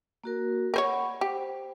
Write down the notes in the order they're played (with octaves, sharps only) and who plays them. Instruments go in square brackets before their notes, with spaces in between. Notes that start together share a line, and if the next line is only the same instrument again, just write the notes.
[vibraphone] A#3 F#4 A#4
[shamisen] A#4 C5 C#5 [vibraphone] F#5 B5 C#6
[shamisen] G4 [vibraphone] C5